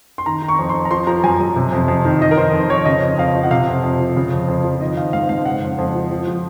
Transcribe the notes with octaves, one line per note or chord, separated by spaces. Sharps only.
C6
D#3 A#5
D#3
C#6
F2
C6
F2
A#5
F3 C6
F3 A#5
F#2 G#5
F#2
C3
F2
F2
D#3
D#3 D#5
A#4
D#3 C5
F2
F2 C#5
C#3 D#5
F2
F2 F5
F3
F#5
C3 F5
F2
F2
F3
C#3
F2
F2
F3
D#3 D#5
D#3 F5
G#2 F5
G#2 F5
C#3 F#5
F2
F2
F3
F3
F3